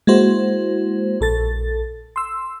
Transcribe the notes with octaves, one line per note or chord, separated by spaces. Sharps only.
G#3 A#3 E4 F#4 C5
A#1 A4 A6
C6 E6